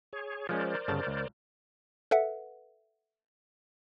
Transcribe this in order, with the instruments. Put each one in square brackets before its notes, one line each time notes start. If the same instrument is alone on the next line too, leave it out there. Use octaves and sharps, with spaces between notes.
[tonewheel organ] G#4 C#5
[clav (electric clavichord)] F3 G#3 C#4 [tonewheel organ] A#4 C5 D5
[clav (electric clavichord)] G1 C#3 A5
C#2
[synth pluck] A4 B4 E5 F#5